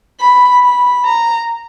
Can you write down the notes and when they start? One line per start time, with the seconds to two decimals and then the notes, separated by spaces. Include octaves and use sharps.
0.20 B5
0.63 B5
1.05 A#5